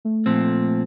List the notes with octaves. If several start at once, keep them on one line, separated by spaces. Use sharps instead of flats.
A3
A#2 F3 C4